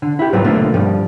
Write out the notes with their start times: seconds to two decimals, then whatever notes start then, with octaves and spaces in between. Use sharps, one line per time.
0.02 D3
0.19 E4 G4
0.33 G#2 F#3 G3 B3 C4 F4
0.44 B1 D3 F3 A3 A#3 F4
0.74 G2 F3 G3